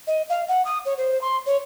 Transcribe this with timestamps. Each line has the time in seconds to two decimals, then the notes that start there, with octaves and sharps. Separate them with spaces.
0.07 D#5
0.29 F5
0.48 F#5
0.65 D#6
0.85 C#5
0.98 C5
1.21 C6
1.46 C#5